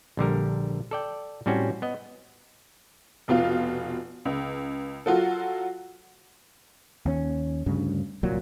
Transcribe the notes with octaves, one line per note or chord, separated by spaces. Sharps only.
A#1 D3 G3 A#4
A4 D5 G5
A2 G3 C4 C#4 F#4
B3 D#5
F1 B2 F4 F5
C#2
F#3 F4 F#4 A4
D#2 C#4
D2 G2 C#3
D1 C2 A#2 F#3